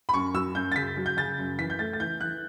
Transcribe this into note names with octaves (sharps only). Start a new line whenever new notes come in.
B5
F#2 C#6
F#3 E6
F#2 G6
A6
C#3 B6
F#3
G6
C#3 A6
F#2
E3 B6
G6
A3 A6
A6
E3 G6
E3 F#6